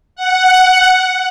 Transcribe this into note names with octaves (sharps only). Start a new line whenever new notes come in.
F#5